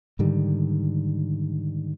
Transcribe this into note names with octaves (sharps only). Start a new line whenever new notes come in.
G#2 D3 D#3 G3